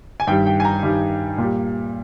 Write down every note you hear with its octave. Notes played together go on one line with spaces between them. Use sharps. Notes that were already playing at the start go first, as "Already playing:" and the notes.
G#5
G2 D#3 G3 G5
G5
G#5
A#5
G2 D#3 G3
A#2 G3